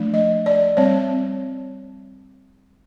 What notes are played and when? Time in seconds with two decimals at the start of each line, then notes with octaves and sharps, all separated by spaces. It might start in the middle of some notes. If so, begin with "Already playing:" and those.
Already playing: F3 A3 D4
0.14 D#5
0.46 D5
0.77 G3 C4 C#5